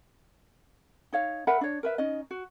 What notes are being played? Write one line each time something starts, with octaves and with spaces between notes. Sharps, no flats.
D#4 C#5 F5
A#4 E5 F#5 B5
D4 C#5
A#4 B4 E5
C#4 D#4 D#5
F#4